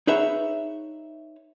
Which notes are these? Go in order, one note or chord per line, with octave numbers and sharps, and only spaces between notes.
D#4 G#4 B4 C#5 E5